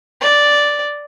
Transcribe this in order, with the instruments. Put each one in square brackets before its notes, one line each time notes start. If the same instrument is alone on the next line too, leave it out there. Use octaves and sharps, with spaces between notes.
[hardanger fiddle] D5